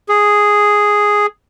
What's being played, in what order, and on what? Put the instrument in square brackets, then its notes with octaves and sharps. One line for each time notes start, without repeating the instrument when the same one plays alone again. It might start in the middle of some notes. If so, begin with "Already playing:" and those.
[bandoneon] G#4